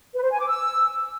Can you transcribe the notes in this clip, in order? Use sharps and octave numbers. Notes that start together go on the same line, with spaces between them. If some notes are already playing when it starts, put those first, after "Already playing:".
B4
C5
G#5
D6
E6